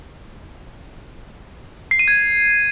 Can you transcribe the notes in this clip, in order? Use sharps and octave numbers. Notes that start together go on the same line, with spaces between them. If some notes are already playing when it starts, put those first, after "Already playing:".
C7
D#7
G#6